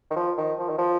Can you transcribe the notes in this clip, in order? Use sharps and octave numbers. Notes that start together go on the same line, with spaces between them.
D#3
F3
D#3
F3
D#3
F3